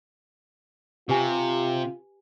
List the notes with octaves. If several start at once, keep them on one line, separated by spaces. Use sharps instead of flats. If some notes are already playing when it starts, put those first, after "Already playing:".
C3 F4 G4 B4 G#5